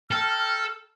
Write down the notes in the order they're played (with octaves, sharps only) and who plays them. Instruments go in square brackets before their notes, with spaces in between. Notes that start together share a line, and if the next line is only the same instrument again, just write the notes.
[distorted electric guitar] A4 [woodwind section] G5 A#5 F6